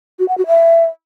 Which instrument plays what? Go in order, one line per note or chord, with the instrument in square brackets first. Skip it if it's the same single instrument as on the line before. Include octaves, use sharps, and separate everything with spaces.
[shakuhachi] F#4
F#5
F#4
E5